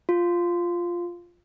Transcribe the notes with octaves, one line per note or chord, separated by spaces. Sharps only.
F4